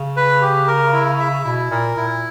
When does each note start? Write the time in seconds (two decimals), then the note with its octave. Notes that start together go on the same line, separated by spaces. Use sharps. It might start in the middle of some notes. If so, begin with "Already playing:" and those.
Already playing: C#3
0.17 B4
0.42 G4
0.68 A#4
0.93 E4
1.19 E5
1.44 B2 E4
1.71 A#2 A#4
1.96 A#2 E4